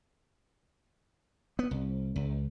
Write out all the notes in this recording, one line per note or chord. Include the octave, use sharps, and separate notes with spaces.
B3
C2
C#2